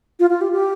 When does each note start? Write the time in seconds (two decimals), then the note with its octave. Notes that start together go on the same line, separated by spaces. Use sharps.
0.20 F4
0.30 F4
0.41 G4
0.52 G4